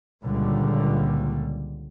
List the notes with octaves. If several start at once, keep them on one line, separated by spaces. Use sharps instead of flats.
C#2 A#2 D3 G3